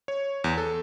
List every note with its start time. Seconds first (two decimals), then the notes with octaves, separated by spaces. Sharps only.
0.08 C#5
0.44 E2
0.58 A4